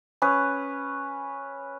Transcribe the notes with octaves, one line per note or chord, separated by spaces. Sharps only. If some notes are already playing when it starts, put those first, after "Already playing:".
C#4 B4 D#6